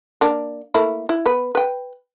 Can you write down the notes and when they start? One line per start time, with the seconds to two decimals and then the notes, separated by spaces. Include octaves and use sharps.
0.21 A#3 D4
0.74 A3 A#3 E4
1.09 E4
1.26 B3 B4
1.55 B4 G5